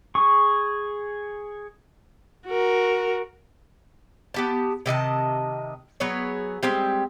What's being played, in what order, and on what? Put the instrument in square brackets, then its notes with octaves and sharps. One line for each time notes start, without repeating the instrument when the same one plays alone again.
[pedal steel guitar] G#4 C#6
[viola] F#4 A#4
[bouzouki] B3 G4 A5
C3 D#3 D#5 A5
F#3 B3 G#4 C#5
G3 G#3 C4 G4